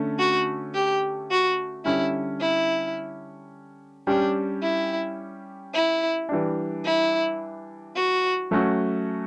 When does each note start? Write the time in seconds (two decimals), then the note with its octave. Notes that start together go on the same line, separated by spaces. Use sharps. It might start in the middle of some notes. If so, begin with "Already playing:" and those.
Already playing: D3 A3 C#4
0.19 F#4
0.74 G4
1.30 F#4
1.85 D3 G3 C#4 E4
2.41 E4
4.07 G3 C#4 D4 G4
4.63 E4
5.74 E4
6.29 E3 G3 D4
6.85 E4
7.96 F#4
8.51 F#3 A3 C#4 F#4